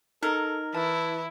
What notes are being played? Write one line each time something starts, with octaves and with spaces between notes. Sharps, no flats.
D#4 A4 A#4
E3 E4 A5